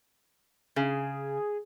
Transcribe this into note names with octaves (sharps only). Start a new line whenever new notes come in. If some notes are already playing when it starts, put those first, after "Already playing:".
C#3 G#4